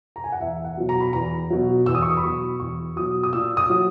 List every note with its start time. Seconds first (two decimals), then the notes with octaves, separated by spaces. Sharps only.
0.16 A#5
0.24 G#5
0.32 F#5
0.40 E2 E5
0.64 F#5
0.77 B2 F#3
0.89 A#5
1.01 B5
1.13 E2 A#5
1.50 B2 F#3
1.86 E2 E6
1.95 D#6
2.02 C#6
2.10 D#6
2.17 B5
2.23 B2 F#3 C#6
2.59 E2 C#6
2.96 B2 F#3 D#6
3.23 D#6
3.33 A#2 E6
3.57 D#6
3.70 F#3